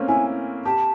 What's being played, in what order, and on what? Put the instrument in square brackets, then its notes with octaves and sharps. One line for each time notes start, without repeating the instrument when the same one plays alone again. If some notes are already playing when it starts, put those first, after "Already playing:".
Already playing: [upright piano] A3 A#3 C4 C#4
[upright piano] E4 [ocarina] G#5
[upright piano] G4 [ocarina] A5